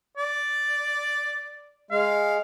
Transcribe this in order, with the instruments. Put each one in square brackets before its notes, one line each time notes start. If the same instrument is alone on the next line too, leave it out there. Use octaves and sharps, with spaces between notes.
[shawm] D5
[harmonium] G#3 [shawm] F5